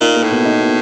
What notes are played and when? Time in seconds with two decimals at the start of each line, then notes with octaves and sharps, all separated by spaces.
0.01 A#2 D#4
0.16 A#3
0.23 A2
0.31 B2
0.45 D#4
0.60 B2